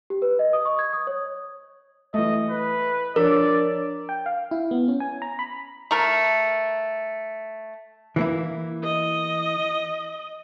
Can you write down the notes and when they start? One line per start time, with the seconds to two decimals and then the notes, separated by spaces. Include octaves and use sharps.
0.10 G4
0.22 B4
0.39 D#5
0.53 D#6
0.65 C#6
0.79 G#6
0.93 D#6
1.07 C#5
2.14 E3 A3 D#5
2.50 B4
3.16 F3 D4 A#4 C#5 D5
4.09 G5
4.26 F5
4.51 E4
4.71 B3
4.88 C#4
5.00 G#5
5.22 A#5
5.39 B5
5.91 A3 A#4
8.16 E3 A#3 E4
8.84 D#5